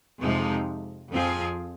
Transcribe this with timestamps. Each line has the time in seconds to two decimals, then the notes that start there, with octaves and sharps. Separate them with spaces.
0.22 F2 C3 F3 G#3 D#4
1.10 F2 F3 C4 F4 G#4